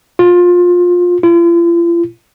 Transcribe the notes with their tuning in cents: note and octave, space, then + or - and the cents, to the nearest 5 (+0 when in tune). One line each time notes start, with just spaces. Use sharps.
F4 +20
F4 -45